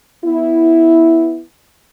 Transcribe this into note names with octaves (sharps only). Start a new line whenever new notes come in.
B3 E4